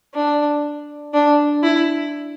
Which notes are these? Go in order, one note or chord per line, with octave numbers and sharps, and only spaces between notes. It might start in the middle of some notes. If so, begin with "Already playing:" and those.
D4
D4
E4